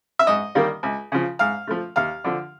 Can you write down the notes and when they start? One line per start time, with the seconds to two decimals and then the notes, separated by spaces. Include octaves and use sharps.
0.19 E5
0.27 G#2 D#5
0.55 D#3 G3 A#3
0.83 C#2
1.12 C#3 F3
1.39 G#2 F5
1.67 F3 A3
1.96 D#2 F5
2.24 D3 F3